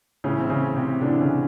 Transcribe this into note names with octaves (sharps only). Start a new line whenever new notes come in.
A2 C#3 E3 C#4
C4
C#3 C#4
C3 C4
A2 D3 E3 D4
C#3 C#4